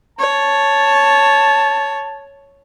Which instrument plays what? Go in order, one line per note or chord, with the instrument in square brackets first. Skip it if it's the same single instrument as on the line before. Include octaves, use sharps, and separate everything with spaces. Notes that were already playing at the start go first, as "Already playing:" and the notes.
[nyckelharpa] C#5 [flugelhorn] A5